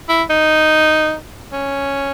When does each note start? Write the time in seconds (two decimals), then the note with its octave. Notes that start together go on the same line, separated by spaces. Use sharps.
0.09 E4
0.30 D#4
1.53 C#4